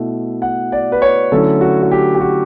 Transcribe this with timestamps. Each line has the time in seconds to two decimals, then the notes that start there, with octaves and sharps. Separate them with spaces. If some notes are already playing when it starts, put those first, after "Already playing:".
Already playing: B2 A3 E4
0.42 F#5
0.72 D5
0.92 B4
1.02 C#5
1.32 D3 F#3 A3 C#4 E4 A4
1.61 F#4
1.82 F#4
1.91 G4
2.15 G4
2.20 F#4